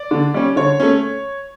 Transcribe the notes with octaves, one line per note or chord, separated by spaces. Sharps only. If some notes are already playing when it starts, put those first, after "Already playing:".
Already playing: D5
D3
G3 C#4
D3 C#5
A3 C#4